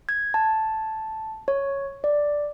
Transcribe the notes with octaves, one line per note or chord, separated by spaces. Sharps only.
G#6
A5
C#5
D5